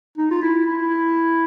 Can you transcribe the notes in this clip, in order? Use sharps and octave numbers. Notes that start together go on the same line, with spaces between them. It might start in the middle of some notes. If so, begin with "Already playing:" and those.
D#4
F4
E4
E4